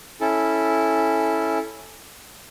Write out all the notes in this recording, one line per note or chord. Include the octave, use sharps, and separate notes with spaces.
C#4 E4 A4